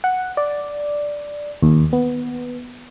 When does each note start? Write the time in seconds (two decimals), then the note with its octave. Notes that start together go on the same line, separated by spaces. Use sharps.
0.04 F#5
0.37 D5
1.62 D#2
1.93 B3